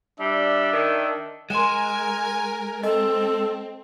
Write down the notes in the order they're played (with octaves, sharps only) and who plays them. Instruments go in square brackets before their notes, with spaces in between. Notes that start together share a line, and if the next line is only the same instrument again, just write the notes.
[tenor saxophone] G3 [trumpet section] D4 E5
[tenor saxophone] D#3
[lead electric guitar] G#3 [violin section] A#4 G#5 [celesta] C6 E7
[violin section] C4 [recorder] A4 [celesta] D#5